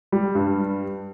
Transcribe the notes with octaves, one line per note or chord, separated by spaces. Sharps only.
G3
G2